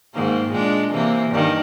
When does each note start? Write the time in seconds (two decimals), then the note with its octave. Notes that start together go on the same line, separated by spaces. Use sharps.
0.14 G#2 D#3 A#3
0.50 A#2 G#3 D4
0.91 C3 E3 A#3
1.30 G2 D#3